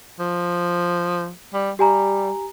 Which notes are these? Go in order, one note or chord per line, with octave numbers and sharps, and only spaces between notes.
F3
G3
G3 G4 G#5 A#5